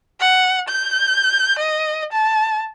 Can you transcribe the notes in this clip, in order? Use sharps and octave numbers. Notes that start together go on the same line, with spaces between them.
F#5
G6
D#5
A5